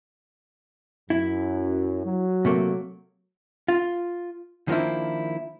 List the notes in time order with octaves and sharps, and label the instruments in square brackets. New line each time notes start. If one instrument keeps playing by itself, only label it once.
[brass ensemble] F#2 [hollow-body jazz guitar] E4
[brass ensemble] F#3
[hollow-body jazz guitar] C3 A3 A#3
F4
D#3 F3 A#3 D4 E4